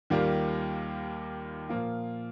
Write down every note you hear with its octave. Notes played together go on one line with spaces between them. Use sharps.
D#2 D#3 G3 A#3 F4
A#2 F3 A#3 F4